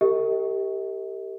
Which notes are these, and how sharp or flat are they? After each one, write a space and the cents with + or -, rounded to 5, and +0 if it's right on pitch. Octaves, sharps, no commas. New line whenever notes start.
G4 +0 A#4 -45 D#5 +45